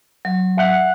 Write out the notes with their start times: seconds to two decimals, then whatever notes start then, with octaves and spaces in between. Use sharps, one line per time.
0.25 F#3
0.57 E5 F#5